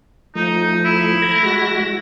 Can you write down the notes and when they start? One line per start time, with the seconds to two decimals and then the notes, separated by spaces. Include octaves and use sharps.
0.35 F3 A3 D#4
0.85 E4
1.22 A#5 G#6
1.43 G#3 F#4 A#6